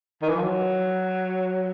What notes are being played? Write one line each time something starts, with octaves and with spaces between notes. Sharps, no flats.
D#3
E3
F3
F#3